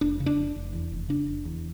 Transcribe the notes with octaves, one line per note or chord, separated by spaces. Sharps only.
F1 D4
C#3
D4
F1
F1
E2
F1
C#3 D4
F1
E2